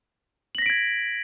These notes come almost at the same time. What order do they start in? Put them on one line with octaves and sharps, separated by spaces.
F#7 A#6 B6 D7 G#6